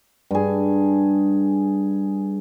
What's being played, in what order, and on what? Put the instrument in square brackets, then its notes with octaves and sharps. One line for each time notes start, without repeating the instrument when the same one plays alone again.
[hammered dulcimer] G2 G#4